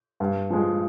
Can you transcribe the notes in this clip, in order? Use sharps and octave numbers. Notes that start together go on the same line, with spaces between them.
G2
F3 G#3